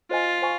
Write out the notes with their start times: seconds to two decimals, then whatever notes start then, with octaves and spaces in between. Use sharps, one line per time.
0.11 F4 C5 D#5 G#5
0.42 C5 F5 G#5 C#6